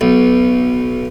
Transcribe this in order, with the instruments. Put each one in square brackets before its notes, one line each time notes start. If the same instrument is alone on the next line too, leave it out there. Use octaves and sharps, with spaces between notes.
[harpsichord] B1